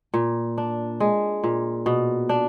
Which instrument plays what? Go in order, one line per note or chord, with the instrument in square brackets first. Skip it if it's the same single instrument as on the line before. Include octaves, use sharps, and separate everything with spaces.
[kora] A#2
D4
G#3
A#2
B2
D4